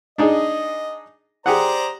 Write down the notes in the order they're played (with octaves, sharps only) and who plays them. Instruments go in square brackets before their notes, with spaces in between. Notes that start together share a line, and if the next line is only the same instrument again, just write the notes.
[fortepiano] D4 D#4 G#4 [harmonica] D#5
[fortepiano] G4 G#4 F#5 [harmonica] C5 D5 A#5